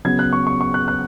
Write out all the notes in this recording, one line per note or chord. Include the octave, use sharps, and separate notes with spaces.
C#3 F#3 B3 G#6
F#6
C#6
C#6
C#6
F#6
F#6